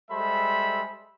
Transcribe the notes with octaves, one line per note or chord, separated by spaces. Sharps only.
G3 G#3 A4 C5 E5 B5